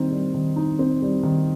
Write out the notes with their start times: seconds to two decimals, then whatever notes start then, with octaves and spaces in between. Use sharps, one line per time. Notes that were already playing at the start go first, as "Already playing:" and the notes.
Already playing: D#3 G3 C4 D#4
0.11 G3
0.34 D#3
0.56 D#4
0.79 C4
1.02 G3
1.23 D#3